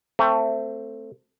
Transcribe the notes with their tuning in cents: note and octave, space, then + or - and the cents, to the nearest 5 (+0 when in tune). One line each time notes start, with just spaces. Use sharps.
A3 +20 C4 +0